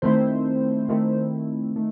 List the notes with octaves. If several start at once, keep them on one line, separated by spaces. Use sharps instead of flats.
D#3 A3 C4 E4 C5
D#3 A3 C4 E4
D#3 A3